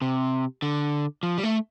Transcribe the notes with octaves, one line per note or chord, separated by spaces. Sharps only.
C3
D3
F3
G3
A3